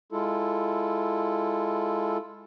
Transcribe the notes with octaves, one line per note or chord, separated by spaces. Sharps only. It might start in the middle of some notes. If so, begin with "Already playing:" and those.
G#3 E4 F4 A4